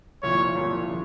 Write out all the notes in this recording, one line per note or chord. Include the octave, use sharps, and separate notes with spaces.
C2 A#2 F3 C#5
C2 A#2 F3
C#3 F3